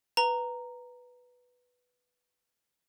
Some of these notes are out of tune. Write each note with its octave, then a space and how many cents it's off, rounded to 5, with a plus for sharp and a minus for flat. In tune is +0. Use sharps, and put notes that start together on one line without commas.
B4 +0 A#5 -5